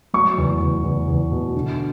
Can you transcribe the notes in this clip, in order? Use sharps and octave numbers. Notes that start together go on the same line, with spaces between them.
F#3 C#6
E2
E2
E2
E2
B2
D3